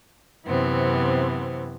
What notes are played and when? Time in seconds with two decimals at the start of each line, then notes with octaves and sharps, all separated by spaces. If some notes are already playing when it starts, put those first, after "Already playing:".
0.45 F#2 C3 E3 B3 C4